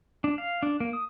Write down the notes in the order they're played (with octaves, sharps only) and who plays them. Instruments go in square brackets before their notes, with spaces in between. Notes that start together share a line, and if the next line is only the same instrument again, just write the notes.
[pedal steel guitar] D4
F5
D4
A#3
D#6